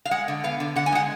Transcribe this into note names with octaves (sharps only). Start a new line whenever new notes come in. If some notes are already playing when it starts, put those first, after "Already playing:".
F5
G#3 F#5
D3
B3 F5
D3
D3 F#5
G#5
G#3 F#5